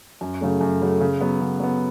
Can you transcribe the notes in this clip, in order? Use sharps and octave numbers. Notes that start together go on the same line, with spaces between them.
F#2
C#3 F#3 A3
F#2
C#3 F#3 A3
C#3
F#3 B3
C#3
F#3 B3